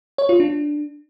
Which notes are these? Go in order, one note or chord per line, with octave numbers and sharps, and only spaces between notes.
C#5
F4
D4